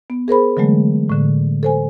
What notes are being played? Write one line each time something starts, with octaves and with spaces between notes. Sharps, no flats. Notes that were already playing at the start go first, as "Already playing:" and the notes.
B3
G#4 A#4 C5 B5
D3 E3 F#3 G#3 A3
A2 D3
A4 C5 G#5